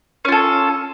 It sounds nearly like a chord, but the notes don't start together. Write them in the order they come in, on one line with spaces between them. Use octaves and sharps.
C#4 F4 A4